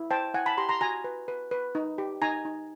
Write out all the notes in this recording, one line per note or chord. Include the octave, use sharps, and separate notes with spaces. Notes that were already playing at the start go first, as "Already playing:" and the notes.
Already playing: E4
C5 G5 A5
E4 F#5 G#5
A5 B5
G4 A#5 C6
A#5 C6
F#4 G#5 A#5
B4
B4
B4
D#4
G4
D#4 G#5 A#5
D#4